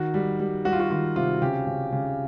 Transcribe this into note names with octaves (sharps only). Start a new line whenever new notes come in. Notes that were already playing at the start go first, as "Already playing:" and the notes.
Already playing: D#3 F#4
G3
G3
G3 F#4
F4
F#4
D#3 F4
C3 F4
C#3 G4
C#3
C#3